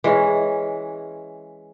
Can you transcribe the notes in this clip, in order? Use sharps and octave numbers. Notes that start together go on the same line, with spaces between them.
E3 G#3 C#4